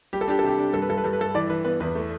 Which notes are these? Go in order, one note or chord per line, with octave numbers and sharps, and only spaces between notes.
G3 G4
A4
D4 G4
A4
C3 G4
D4
G2 A4
B4
G2 A4
B4
G2 A4
B4
G2 A4
E3 D5
E3 B4
B3 B4
E2 B4
A3